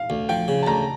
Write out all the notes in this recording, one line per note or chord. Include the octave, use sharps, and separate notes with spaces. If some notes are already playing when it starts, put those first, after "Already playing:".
Already playing: F5
D2
F3 G5
C#3
A5
D2 A#5